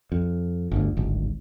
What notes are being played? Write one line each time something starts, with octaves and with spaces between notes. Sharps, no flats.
F2
G1 D2
D1 G#1